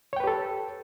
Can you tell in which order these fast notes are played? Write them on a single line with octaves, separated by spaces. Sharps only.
C#5 G5 B4 G4 A4